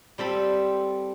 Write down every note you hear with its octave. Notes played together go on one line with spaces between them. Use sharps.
G3 C4 A4 B5